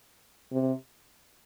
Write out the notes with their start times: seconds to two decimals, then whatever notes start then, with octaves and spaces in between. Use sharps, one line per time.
0.52 C3